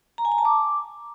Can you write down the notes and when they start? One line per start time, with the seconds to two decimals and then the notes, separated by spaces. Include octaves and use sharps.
0.18 A#5
0.25 G#5
0.32 A#5
0.38 A5
0.45 D6